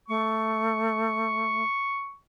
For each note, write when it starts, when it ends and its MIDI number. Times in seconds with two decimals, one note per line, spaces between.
0.09 1.63 57
0.09 2.13 85